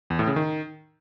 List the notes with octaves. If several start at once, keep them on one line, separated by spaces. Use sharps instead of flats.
E2
A2
C#3
D#3